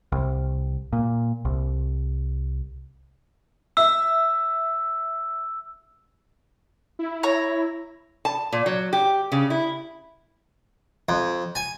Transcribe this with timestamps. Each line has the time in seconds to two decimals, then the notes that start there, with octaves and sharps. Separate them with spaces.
0.12 C2
0.93 A#2
1.45 C2
3.77 E5 E6
6.99 E4
7.23 C#5 A#5
8.25 A5
8.52 A#2
8.66 F#3
8.93 G4
9.32 C#3
9.50 E4
11.09 F2
11.55 G#5